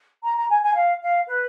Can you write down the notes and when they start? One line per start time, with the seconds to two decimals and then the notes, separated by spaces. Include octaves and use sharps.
0.23 A#5
0.37 A#5
0.49 G#5
0.62 G#5
0.75 F5
1.01 F5
1.28 B4